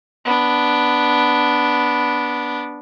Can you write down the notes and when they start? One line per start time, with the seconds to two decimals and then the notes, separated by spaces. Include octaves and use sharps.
0.25 B3 D4